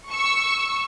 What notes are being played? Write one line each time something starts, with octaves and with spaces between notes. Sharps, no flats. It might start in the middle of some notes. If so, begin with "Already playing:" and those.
C#6 E6